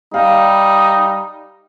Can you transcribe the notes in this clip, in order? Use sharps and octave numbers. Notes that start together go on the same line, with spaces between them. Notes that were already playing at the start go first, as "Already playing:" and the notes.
G3 D#4 F5